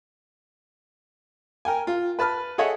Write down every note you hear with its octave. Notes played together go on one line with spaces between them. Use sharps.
A#4 G5 G#5
F4
B4 A5 B5 F6
G#4 A4 C#5 D#5 E5 F#5